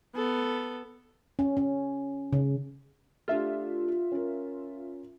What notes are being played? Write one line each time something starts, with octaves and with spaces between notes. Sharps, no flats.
B3 A4
C#4
C#4
C#3
A3 D4 F4 G4 E5
C#4 A#4